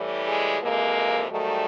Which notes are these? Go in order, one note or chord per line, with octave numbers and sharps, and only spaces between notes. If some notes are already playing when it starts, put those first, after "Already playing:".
Already playing: A2 E3 G3
G#3
F2 C3 E3 G#3 A#3
G#2 D#3 F#3 G3 A3